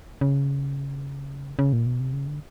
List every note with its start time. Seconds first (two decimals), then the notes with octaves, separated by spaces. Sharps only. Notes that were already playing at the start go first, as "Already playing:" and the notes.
0.21 C#3
1.59 C#3
1.73 A#2
1.86 B2
2.00 C3
2.13 C#3
2.27 D3